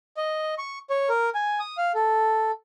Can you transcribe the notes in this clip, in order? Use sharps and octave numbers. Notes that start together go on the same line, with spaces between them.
D#5
C#6
C#5
A#4
G#5
D#6
F5
A4